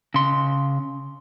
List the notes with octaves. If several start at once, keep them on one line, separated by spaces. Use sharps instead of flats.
C#3 C6